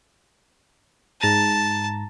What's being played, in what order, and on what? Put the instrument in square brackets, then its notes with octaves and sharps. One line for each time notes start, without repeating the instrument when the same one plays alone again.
[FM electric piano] G#2 A#5 A6 [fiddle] A5